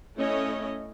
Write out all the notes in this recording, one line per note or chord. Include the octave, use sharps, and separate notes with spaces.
A3 C#4 E4 C#5 D#5